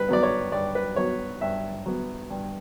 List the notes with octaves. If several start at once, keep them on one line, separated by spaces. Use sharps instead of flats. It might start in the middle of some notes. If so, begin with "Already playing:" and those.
Already playing: G2 B4
F#3 B3 D5
C#5
G2 D5
B4
F#3 B3 C#5
G2 E5
F#3 B3
G2